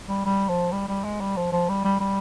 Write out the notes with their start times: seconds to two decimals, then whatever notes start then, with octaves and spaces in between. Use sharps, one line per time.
0.08 G3
0.25 G3
0.49 F3
0.72 G3
0.88 G3
1.04 G#3
1.21 G3
1.37 F3
1.52 F3
1.69 G3
1.85 G3
2.01 G3